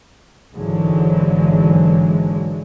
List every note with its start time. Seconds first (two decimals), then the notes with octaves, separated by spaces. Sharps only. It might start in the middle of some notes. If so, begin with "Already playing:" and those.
0.53 G#1 G#2 D3 E3 F#3 G#3